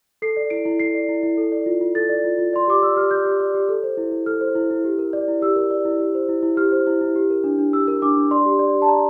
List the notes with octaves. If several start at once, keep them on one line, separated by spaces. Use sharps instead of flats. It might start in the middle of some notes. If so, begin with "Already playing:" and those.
A4 C7
D5
E4 D7
E4
A4 C7
D5
E4
E4
A4
D5
F4
F4
A4 A6
D5
F4
F4
D5 C6
G4 D6
D5 E6
G4 F6
D5 G6
G4
D5
G4
A4
C5
E4
E4
A4 F6
C5
E4
E4
G4
A#4
D5
E4
G4 E6
A#4
D5
E4
G4
C5
E4
E4
G4 F6
C5
E4
E4
G4
A#4
D4
D4
G4 E6
A#4
D4 D6
D4
D5 C6
G4
D5
G4
A5
D5 A#5